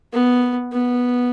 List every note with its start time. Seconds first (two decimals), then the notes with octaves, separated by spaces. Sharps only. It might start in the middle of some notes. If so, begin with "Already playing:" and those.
0.13 B3
0.73 B3